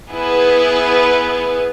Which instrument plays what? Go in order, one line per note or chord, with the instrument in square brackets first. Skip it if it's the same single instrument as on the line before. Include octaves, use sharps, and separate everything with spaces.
[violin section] B3 E4 G#4 B4